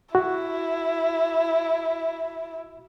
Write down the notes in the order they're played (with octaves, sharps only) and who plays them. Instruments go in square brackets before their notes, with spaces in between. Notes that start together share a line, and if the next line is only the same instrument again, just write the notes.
[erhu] E4 [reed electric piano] F#4